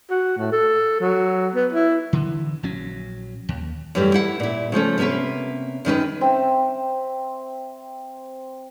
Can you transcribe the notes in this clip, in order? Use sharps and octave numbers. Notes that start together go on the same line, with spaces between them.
F#4
A2
A4
F#3
B3
E4
D3 E3
A#1 F#3 C#4
D#2
F#2 E3 G3 A3
E4 F#5
A#2 E4
C#3 F3 A3 C#4
C3 A#3 B3 C#4 B4
F#2 D#3 C#4 B4
C4 E5